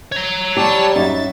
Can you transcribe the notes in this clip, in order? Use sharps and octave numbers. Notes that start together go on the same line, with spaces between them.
C#5 A#5
G3 G4 A5 C#6
F#2 D#4 E5 A6